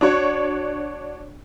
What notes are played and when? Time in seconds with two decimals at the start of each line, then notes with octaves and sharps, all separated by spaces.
0.01 D4 F#4 C#5